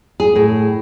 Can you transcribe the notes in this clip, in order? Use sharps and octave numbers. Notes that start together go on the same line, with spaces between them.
G#4
A2